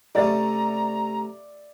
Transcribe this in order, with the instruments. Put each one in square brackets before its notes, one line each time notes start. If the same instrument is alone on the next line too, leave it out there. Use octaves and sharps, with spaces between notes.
[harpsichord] C3 A3 C#4 [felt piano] D5 E5 A6 [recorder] A#5